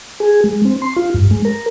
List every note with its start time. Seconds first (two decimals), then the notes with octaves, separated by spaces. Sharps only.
0.20 G#4
0.44 G#3
0.65 C4
0.82 C6
0.96 F4
1.14 G2
1.31 G#3
1.45 A#4